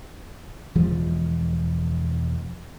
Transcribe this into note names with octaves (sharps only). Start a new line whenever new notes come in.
E1 E3 F3 G#3